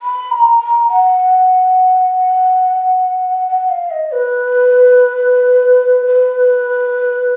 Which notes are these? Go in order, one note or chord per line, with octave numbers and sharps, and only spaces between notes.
B5
A#5
A#5
F#5
F#5
F5
D#5
B4
B4